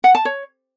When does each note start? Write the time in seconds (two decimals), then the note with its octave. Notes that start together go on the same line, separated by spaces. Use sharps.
0.04 F#5
0.15 A5
0.25 C#5